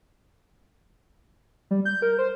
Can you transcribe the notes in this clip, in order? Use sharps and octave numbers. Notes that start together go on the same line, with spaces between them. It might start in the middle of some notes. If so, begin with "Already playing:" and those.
G3
G6
A#4
C5